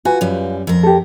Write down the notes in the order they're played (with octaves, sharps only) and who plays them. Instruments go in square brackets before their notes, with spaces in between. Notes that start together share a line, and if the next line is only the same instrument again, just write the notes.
[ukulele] F4 B4 G#5 [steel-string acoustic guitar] F#4
[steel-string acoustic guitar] F#2 G3
F2 A#4
[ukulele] G4 A4